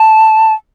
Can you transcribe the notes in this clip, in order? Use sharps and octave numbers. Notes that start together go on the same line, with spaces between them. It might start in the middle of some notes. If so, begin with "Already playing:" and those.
Already playing: A5